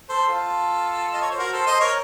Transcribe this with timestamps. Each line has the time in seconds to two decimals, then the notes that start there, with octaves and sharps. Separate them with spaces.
0.09 A4 C5
0.28 F4 A4
1.13 D#5
1.21 C#5
1.30 C5
1.39 F#4 A#4
1.52 A4 C5
1.67 C5 D#5
1.80 A#4 C#5